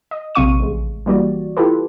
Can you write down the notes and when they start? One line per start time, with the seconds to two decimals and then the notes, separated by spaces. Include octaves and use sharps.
0.11 D#5
0.35 A#1 C3 C4 F5 C#6 D#7
0.60 A1 G#3
1.06 E3 G3 A#3 F#4 D5
1.57 E4 F4 G4 A4 B4